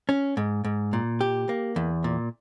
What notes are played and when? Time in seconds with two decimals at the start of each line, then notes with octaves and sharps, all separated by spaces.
0.09 C#4
0.37 G#2
0.64 G#2
0.93 A#2
1.21 G4
1.49 A#3
1.76 E2
2.04 A#2